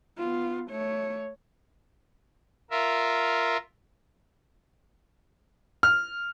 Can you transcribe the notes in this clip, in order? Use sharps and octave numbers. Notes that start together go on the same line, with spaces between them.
B3 F4
A3 C#5
F4 A#4 E5
F6